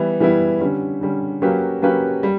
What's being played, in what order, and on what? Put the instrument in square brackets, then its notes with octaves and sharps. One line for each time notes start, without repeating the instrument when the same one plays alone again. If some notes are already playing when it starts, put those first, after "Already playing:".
Already playing: [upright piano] E3 G3 B3 E4
E3 G3 B3 E4
D3 G3 C#4
D3 G3 C#4
F#3 A#3 C#4 G4 B4
F#3 A#3 C#4 G4 B4
G3